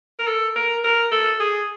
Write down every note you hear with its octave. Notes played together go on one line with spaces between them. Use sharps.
A#4
A4
A#4
A#4
A4
G#4